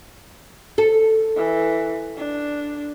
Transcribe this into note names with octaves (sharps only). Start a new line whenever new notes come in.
A4
E3
D4